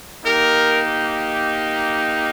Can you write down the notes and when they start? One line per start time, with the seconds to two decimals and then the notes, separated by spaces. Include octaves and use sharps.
0.24 A#3 D#4 G4 A#4